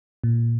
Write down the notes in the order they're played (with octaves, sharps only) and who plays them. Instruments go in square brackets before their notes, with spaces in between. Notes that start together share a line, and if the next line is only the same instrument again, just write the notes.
[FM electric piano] A#2